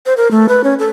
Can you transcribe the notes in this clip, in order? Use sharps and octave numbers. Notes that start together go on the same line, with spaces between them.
C5
A#4
A3
B4
C#4
A4